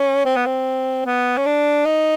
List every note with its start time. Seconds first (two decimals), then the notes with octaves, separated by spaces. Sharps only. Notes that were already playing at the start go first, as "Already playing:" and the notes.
Already playing: C#4
0.25 C4
0.36 B3
0.46 C4
1.05 B3
1.37 C#4
1.46 D4
1.86 D#4